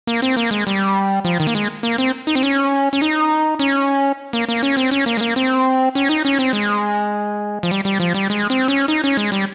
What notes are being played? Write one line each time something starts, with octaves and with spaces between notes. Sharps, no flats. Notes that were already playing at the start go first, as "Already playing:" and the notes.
A#3
C4
A#3
G#3
G3
F3
D#3
A#3
G#3
A#3
C4
D#4
C4
C#4
C#4
D#4
C#4
A#3
A#3
C#4
C4
C#4
A#3
G#3
A#3
C4
C#4
D#4
C#4
C4
G#3
F3
G3
G3
F3
G3
G#3
C4
C#4
D#4
C#4
G#3
G3